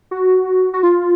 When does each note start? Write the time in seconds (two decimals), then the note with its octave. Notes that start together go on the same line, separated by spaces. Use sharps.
0.11 F#4
0.73 F#4
0.83 F4